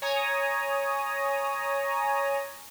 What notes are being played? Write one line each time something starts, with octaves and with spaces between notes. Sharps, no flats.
C#5 G#5 A#5 D#6